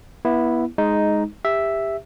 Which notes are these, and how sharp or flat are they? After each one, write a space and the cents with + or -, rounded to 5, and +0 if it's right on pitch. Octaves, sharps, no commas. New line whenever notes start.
B3 -25 E4 +0
G#3 +5 D#4 +0
G4 +25 E5 +0